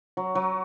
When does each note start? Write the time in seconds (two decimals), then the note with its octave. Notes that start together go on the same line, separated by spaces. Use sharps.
0.17 F#3
0.35 F#3